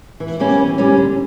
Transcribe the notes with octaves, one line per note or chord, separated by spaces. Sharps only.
E3
G3 A#3 C#4
E3
G3 A#3 C#4
D3